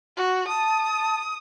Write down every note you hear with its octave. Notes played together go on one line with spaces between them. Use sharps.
F#4
A5 D#6